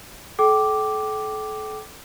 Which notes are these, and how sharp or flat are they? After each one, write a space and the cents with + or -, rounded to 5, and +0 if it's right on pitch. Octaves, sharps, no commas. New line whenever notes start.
A4 -40 G5 -25 D6 +0